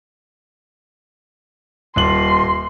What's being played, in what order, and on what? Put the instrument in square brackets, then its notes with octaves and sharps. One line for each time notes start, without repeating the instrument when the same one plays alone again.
[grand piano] D#1 F#7 [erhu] C6